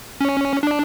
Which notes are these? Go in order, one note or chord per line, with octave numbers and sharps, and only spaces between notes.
C#4
D4